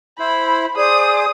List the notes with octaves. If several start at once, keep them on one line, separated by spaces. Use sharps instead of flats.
E4 C5 B5
G#4 C5 D5 D#6